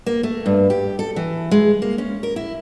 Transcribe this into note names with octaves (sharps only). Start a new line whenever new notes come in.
A#3
A3
G2
G4
A4
E3
G#3
A#3
C#4
A#4
E4